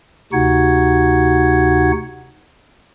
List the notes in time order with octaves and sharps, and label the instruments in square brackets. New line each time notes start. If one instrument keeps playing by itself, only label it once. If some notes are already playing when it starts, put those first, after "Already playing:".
[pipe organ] D2 C3 D#4 F#4 F#5 G#6